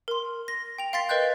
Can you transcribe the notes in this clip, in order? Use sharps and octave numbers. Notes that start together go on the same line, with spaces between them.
A#4 C6
A#6
G5 F7
F5 G5 C6 A6 B6 C7
A#4 B4 D#5 G5 F#6 G6